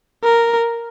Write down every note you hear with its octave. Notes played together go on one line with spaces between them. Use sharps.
A#4